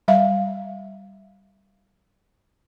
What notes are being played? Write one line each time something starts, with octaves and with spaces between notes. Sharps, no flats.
G3 E5 F5